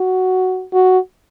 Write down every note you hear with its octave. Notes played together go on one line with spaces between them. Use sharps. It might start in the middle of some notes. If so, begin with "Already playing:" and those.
Already playing: F#4
F#4